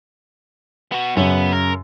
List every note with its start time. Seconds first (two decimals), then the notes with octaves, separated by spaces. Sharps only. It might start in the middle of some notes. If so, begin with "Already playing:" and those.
0.92 B3 F#4
1.17 F#2 C#3 B3
1.52 A#4